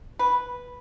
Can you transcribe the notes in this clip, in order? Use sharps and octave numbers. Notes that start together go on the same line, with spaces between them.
B4